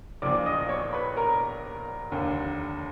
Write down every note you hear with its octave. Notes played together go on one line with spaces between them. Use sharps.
A#1 A#2 F3 D5 D6
D#5 D#6
C#5 C#6
B4 B5
A#4 A#5
F1 D#2 D3